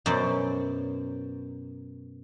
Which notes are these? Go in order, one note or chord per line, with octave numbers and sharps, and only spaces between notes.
F#2 B2 C5 D5